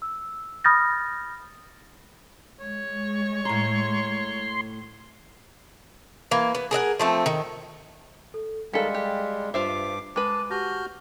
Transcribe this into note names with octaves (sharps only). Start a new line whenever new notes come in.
E6
B5 D#6 F6 G6 A6 A#6
G#3 C#5
A2 A#5 C6
E3 A#3
B3
G#4 A#4 D#5 F#5
F3 A3 C4
D#3
A4
D#3 G3 G#3 A4 F5 B6 C#7
G4
G2 F4 C5 E5 D6 C7
G#3 B4 A5 D6 D#7
F#4 G4 A5 F6 G6 A#6